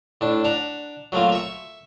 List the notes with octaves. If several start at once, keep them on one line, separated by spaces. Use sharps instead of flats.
A2 D4
D4 F#5 A#5
F#3 A3 A#3 C4 F4
E5 C#6